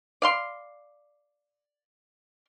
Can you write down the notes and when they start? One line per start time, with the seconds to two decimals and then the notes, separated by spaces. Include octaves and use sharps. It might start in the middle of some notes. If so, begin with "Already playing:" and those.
0.22 D5 F5 C6